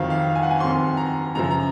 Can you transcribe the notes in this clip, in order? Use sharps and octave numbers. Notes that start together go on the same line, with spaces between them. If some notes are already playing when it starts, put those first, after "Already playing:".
Already playing: F2 D#3 F#3 C4 F5
F5
G#5
F#5
G#5
F2 D#3 F#3 C4 C6
A#5
F#2 C#3 F3 A#5
A#5